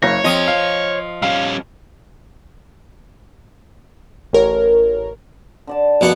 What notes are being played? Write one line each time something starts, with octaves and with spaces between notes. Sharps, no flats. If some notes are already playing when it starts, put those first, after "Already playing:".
F#1 C#5 F5 A#6
F2 F3 D#5
F5
G3 C#4 F5
A1 A#4 C#5
D3 D5 A5
A#1 B2 F#5